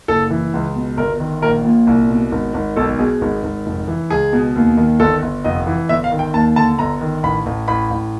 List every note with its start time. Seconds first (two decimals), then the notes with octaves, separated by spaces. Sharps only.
0.08 F#1 A4
0.30 E3
0.53 C#2
0.76 B2
0.97 G1 A#4
1.20 D#3
1.42 A#1 A#4
1.65 A#2
1.87 C2
2.10 B2
2.32 G#1
2.54 G#1
2.76 B1 A4
2.99 B2 G#4
3.21 G#1
3.43 G#1
3.66 F1
3.88 E3
4.10 C#2 G#4
4.33 B2
4.56 D#2
4.77 D#3
5.00 G1 A4
5.22 G1
5.44 F1 D#5
5.67 E3
5.89 G1 E5
6.04 F5
6.11 D#3
6.19 G5
6.34 D#2 A5
6.56 D3 A5
6.79 G1 A#5
7.01 D#3
7.23 A1 B5
7.46 A1
7.68 A1 B5
7.91 A1